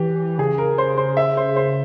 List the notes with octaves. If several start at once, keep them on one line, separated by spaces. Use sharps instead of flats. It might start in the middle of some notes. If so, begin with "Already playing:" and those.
Already playing: E3 G4
C#3 G#4
A#4
C5
C5
E5
C5
C5